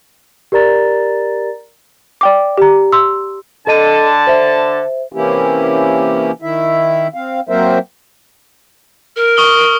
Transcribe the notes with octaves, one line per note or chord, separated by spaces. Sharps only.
G4 A#4 D5 A#5 A6
D5 G5 D6
G4 A#5
C6 E6
D3 A4 D#5 A5 D#7
C5 E5
C3 E3 A#3 C#4 E4 G4
D#3 E4 E5
C4 F5
F#3 A#3 C4 A#4 C5 E5
A#4
C#6 D#6 G7